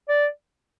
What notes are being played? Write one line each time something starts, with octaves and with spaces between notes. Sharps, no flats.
D5